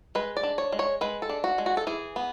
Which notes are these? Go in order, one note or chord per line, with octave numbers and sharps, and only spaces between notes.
G#3 B4
D5
D4
C#5
G#3
C#5
G#3 B4
A4
D4
F#4
G#3
F#4
A4
E3 G#4
B3